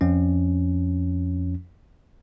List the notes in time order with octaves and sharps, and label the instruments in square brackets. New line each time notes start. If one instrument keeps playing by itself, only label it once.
[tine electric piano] F2 F3 C#4